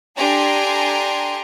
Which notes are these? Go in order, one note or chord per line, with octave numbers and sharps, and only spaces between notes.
D4 G4 A4 G#5 A#5 C6